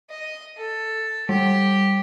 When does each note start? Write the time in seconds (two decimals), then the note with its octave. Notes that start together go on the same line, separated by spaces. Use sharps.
0.10 D#5
0.57 A4
1.29 G3 G4